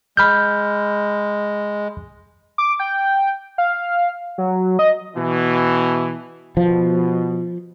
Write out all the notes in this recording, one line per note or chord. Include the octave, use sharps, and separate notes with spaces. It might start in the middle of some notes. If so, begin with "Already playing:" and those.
G#3 B5 F6 G6
D6
G5
F5
F#3
D#5
B2 E3
B2 F3